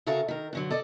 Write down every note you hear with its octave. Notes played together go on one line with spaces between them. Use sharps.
C#3 F#4 A4 A#4 E5 F5
D#3 A#4
G2 D3 F#3
A4 D5 D#5